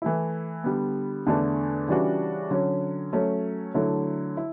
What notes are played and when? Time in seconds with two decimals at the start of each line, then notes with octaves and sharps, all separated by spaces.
0.02 E3 A3 E4
0.64 D3 G3 B3
1.27 E2 D3 A3 D4
1.88 C#3 E3 G3 D4 F#4
2.51 D3 F#3 C#4
3.13 F#3 A3 C#4
3.74 D3 F#3 A3 E4
4.37 E4